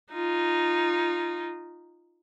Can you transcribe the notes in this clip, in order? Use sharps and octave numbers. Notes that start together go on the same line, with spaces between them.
D#4 F4